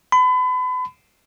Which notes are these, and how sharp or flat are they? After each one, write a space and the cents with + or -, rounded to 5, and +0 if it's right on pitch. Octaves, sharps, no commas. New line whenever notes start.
B5 +35